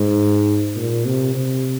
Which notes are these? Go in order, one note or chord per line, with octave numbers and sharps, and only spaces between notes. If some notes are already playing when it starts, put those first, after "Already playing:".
Already playing: G#2
A#2
C3
C3